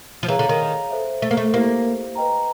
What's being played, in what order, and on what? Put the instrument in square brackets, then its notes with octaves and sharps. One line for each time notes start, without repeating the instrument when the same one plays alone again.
[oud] F3
[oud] E3 [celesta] G#4 C#5 F5 A#5
[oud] D3
D#3
[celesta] A4 C5 E5
[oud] A3
A#3
A3
[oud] A#3 [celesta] E4 G4 C5
[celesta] B4 D#5 G5 A#5